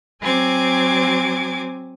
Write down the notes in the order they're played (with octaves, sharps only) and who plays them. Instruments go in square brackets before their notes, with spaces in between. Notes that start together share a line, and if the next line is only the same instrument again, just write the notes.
[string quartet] F#3 C4 G#5 D6 G#6